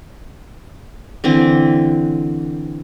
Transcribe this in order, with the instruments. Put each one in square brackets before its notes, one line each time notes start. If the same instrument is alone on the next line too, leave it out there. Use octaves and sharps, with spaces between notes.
[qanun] D3 E3 C4